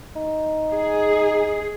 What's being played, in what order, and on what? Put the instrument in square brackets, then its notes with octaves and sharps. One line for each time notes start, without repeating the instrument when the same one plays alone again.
[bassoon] D#4
[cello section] G#4